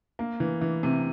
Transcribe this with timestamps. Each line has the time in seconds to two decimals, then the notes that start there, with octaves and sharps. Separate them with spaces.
0.19 A#3
0.40 E3
0.61 E3
0.83 C3